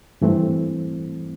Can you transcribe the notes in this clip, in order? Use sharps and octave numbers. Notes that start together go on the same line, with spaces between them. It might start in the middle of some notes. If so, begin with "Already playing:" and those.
G2 E3 A3 C4